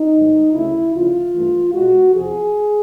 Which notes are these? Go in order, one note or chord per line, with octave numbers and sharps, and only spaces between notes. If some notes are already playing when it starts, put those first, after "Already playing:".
Already playing: D#4
G#2 D#3 F#3 A3
D2 C#3 F#3 A3 E4
D2 C#3 F3 F4
G2 E3 A3
B2 G#3 F#4
E2 C3 F3 G#4